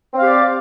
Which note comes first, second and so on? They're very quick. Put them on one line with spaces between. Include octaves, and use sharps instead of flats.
C4 F5 G4 D5